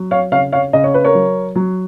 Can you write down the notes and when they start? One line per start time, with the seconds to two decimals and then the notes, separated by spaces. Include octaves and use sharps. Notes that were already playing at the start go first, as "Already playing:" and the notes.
Already playing: F#3
0.11 C#5 F5
0.32 C#3 C#5 F5
0.53 C#5 F5
0.73 C#3 D#5
0.84 C#5
0.94 B4
1.05 A#4 C#5
1.15 F#3
1.56 F#3